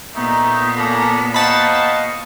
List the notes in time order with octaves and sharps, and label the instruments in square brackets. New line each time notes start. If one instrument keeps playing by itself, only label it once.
[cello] A#2 B3 [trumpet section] A3 D#4
[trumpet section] A#3 C#4 D4 [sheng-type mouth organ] A4 A#5 B5
[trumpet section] D#4 C5 F#5 [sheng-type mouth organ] D#5 F5 C#6 [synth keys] A5 B5